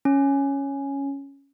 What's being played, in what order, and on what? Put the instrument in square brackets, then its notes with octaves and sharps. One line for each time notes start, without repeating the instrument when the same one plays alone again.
[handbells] C#4